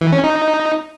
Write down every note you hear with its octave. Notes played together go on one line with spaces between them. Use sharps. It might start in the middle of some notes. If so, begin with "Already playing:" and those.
E3
C#4
D#4